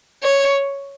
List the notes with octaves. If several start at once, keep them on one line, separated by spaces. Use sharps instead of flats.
C#5